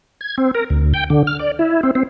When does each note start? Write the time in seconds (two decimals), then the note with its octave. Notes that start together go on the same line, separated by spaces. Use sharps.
0.21 G#6
0.38 C4
0.55 A#4
0.70 D2
0.94 G5
1.10 D3
1.27 F6
1.39 D5
1.59 E4
1.83 C4
1.95 C4